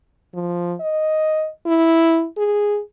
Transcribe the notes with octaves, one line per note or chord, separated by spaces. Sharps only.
F3
D#5
E4
G#4